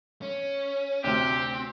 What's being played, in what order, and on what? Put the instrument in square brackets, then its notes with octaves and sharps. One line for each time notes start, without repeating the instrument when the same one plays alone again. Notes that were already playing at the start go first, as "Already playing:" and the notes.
[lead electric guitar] C#4
[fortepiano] D2 C3 [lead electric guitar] C4 [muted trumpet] G4